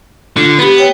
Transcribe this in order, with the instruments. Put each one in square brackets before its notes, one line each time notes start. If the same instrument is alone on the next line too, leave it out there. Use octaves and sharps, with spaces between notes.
[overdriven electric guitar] D3 [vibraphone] F4
[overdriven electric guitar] B3 [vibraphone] G4 B5
[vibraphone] C#5 G5